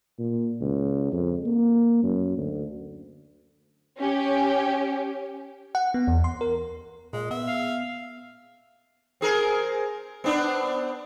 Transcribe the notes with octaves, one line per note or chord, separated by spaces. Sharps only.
A#2
C#2
F2
A#3
F#2
D2
C#4 G4
F#5
B3
E2
C6
A#4
A#2 G#3
B3 E5
F5
C4 G#4 A#4
B3 C4 D4